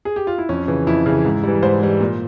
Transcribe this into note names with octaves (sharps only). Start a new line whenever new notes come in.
G#4
G4
F4
E4
F2 C#4
C#3 E3
F2 E4
C#3 E3
G#2
E3 G3
G#2 C5
E3 G3
A#2